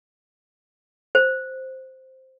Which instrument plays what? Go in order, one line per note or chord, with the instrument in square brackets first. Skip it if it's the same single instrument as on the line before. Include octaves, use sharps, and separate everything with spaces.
[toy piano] C5